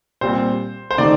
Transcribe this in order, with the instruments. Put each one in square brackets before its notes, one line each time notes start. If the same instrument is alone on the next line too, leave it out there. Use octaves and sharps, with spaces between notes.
[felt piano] A#2 G3 C4 [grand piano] C5
[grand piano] C5
[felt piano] D#3 A3 D#4 G4 [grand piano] D5